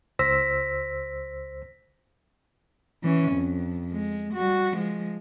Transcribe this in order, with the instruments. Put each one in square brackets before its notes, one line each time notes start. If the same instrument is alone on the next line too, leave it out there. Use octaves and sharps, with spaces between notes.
[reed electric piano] C#2 C5 E6 [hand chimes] A#6 B6
[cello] E3 C#4
F2
G#3
G3 F#4
F3 G#3